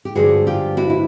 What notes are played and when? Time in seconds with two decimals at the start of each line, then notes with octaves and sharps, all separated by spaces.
0.05 G4
0.15 G2 D3 F3 F#4 G#4
0.47 F4 G4
0.77 E4 F#4
0.90 E4